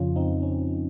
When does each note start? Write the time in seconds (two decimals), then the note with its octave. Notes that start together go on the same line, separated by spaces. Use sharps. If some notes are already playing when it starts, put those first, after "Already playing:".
Already playing: F2 C#3 F3 C#4 F4
0.16 C4 D#4
0.42 C#4